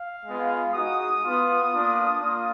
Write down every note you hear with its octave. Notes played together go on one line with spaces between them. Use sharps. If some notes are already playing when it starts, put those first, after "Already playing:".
Already playing: F5
G#3 B3 F4
G#3 D#4 F#4 D#6
B3 F4
A#3 D4 F4
A#3 D4 F4